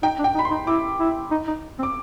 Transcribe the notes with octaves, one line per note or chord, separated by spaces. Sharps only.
D#4 G5
D4
G5
D#4
B5
C6
D#4
E4 D6
E4
D#4
D#4
C4
D6